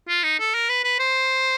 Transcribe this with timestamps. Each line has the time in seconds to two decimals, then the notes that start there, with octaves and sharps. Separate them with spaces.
0.08 F4
0.23 D#4
0.40 A4
0.54 A#4
0.69 B4
0.84 B4
0.99 C5